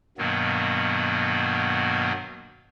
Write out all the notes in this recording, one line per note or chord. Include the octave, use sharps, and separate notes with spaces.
G2 B2 D#3 F#3 A#3 B3